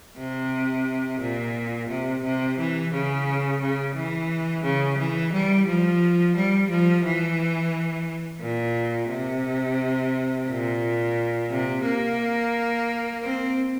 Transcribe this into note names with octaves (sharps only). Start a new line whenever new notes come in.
C3
A#2
C3
C3
E3
C#3
C#3
E3
C#3
E3
G3
F3
G3
F3
E3
A#2
C3
A#2
C3
A#3
C4